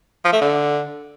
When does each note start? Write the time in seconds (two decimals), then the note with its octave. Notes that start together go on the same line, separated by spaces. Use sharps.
0.25 F3
0.33 A3
0.41 D3